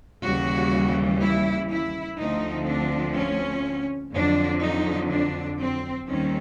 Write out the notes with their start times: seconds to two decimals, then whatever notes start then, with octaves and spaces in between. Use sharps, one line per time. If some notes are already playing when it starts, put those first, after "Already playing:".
0.25 D#2 C#3 E3 G3 F#4
1.22 E4
1.71 E4
2.19 D2 D3 F3 A3 C4 D#4
2.68 D4
3.17 C#4
4.14 F2 D3 F#3 D4
4.62 D#4
5.11 D4
5.60 C4
6.08 D#2 D#3 G3 C4 C#4